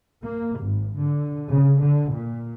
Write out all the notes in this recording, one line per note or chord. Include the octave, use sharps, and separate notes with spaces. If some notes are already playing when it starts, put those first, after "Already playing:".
A#3
G#1
D3
C#3
D3
A#2